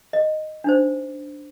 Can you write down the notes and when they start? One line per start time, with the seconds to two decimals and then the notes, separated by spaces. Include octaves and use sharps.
0.13 D#5
0.64 D4 D#4 C5